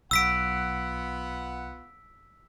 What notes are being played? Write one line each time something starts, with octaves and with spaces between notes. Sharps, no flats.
B1 B3 F4 F#5 E6 B6 D7